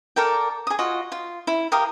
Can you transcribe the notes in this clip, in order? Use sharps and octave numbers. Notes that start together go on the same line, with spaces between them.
A4 A#4 D5 G5
G#4 D#6
F4 F#4 D#5
F4
E4
G4 A#4 F5 D#6